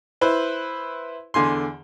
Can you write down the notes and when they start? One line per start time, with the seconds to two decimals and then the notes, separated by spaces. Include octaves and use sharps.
0.21 E4 B4 C5
1.34 E2 D3 G#5 C6